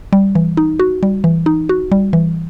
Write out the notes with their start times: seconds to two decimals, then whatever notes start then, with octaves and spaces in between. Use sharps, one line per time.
0.13 G3
0.35 E3
0.57 D#4
0.80 F#4
1.03 G3
1.24 E3
1.46 D#4
1.69 F#4
1.92 G3
2.13 E3